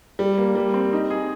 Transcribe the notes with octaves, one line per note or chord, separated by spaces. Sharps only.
G3
A#3
G3
C4
D#4
G#4